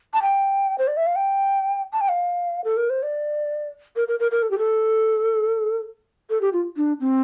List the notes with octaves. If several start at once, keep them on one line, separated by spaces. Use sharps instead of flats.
A5
G5
C5
D5
E5
F5
G5
A5
G5
F5
A4
A#4
C5
D5
A#4
A#4
A#4
A#4
A4
G4
A4
A4
G4
F4
D4
C4